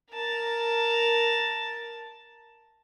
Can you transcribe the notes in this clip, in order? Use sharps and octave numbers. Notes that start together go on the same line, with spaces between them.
A#4 A5